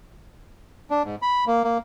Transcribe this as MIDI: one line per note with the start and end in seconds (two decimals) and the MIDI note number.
0.90 1.03 62
1.04 1.15 44
1.22 1.44 83
1.47 1.63 58
1.64 1.78 58